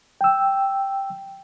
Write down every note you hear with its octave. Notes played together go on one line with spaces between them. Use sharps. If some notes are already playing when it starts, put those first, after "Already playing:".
G5 E6